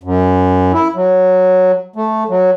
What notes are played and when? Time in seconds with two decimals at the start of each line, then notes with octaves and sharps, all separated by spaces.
0.03 F#2
0.73 E4
0.95 F#3
1.96 A3
2.29 F#3